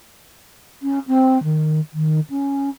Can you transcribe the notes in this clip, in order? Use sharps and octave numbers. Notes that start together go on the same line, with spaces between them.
C#4
C4
D#3
D#3
C#4